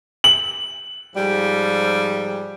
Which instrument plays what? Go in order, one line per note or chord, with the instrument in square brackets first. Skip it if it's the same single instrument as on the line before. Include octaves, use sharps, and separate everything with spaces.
[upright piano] F#7
[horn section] G#2 F3 G3